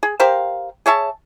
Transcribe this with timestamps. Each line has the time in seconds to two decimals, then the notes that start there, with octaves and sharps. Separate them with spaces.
0.03 G#4
0.20 G4 A#4 C5 F5
0.86 G#4 C#5 E5 A5